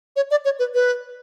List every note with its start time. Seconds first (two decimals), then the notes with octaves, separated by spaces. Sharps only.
0.16 C#5
0.31 D5
0.45 C#5
0.59 B4
0.74 B4